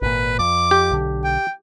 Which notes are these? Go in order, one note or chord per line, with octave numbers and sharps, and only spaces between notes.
G#1 A#2 B4
F2 D6
G4
B1 D3
G5